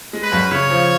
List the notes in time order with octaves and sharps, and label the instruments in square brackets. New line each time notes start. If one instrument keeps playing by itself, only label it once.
[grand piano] G#3
[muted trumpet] B4
[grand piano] F#2
[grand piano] C#3 [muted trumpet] C#5
[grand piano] F3